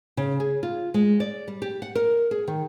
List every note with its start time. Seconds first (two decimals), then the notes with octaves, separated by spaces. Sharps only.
0.17 C#3
0.40 G#4
0.63 F4
0.94 G#3
1.20 D5
1.48 G3
1.62 G4
1.82 F#5
1.95 A#4
2.31 G#4
2.47 D#3